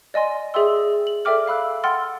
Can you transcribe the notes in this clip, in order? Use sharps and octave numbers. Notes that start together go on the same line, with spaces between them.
D5 D#5 G#5 C6
G#4 D5 E5 G5 C6 E6
F#7
A4 D5 E5 G5 D6 F6
F5 B5 E6 F#6
F#5 G5 C6 E6 F6 A6